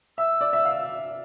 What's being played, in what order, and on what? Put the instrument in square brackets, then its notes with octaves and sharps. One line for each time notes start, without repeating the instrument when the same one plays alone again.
[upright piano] E5 [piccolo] E6
[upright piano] D5
E5
F5